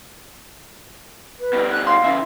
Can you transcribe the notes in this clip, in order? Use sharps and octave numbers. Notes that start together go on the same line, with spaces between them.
B4
B2 G3
F#6
F5 C6
C#3 E3 E5